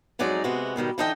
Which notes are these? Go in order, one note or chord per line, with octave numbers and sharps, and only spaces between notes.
F2 F#3 G#3 D#4 D5
C3 G#3 B3 F#4
G#2 B2 D#3 G3
D3 E3 D#4 A4 D#5 G5